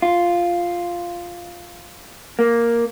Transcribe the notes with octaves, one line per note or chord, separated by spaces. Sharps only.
F4
A#3